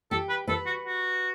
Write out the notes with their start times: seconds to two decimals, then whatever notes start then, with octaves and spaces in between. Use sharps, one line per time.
0.11 G4 A4
0.29 B4
0.47 A4 B4
0.66 F#4
0.85 F#4